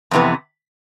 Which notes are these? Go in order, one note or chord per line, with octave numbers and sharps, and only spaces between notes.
F2 C3 E3 B3